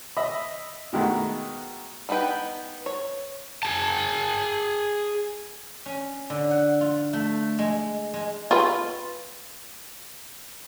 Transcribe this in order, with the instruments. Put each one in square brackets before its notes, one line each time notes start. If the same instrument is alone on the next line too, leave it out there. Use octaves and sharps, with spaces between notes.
[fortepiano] D#5 E5 B5
B2 D#3 G#3 A3 F#4
[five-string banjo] G3 B3 D#4 B4 G5
C#5
[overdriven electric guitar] G#4 A5
[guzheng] C#4
D3
F#5
F4
A3
G#3
G#3
[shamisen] F4 B4